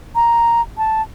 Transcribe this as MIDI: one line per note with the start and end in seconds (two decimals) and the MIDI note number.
0.15 0.61 82
0.77 1.02 81